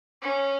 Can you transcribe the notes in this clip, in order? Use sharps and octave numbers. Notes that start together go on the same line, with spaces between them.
C#4